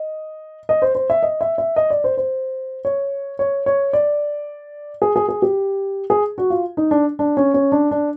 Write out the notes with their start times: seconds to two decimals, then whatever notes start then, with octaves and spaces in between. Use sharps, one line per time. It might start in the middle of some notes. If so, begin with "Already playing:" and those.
Already playing: D#5
0.69 D#5
0.82 C5
0.95 C5
1.10 E5
1.23 D#5
1.41 E5
1.58 E5
1.76 D#5
1.90 D5
2.04 C5
2.17 C5
2.85 C#5
3.39 C#5
3.66 C#5
3.93 D5
5.02 G#4
5.16 G#4
5.29 G#4
5.42 G4
6.10 G#4
6.38 F#4
6.50 F4
6.77 D#4
6.91 D4
7.19 D4
7.37 C#4
7.54 C#4
7.72 D4
7.91 D4